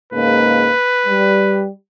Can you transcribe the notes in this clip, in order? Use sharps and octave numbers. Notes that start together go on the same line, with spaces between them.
G#2 C#3 A#3 B4
G3